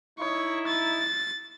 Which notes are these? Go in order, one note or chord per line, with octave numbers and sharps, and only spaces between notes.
D#4 E4 C#5
A6